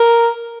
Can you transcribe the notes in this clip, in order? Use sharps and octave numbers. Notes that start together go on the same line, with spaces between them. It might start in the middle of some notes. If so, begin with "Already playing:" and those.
Already playing: A#4